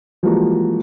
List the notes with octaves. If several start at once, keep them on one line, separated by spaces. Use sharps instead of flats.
E3 F3 G3 G#3 A#3 F#4